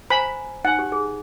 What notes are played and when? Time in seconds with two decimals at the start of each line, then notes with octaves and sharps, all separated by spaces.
0.10 C5 G#5 A#5 B5
0.65 D#4 F#5 G#5
0.79 G4
0.92 G#4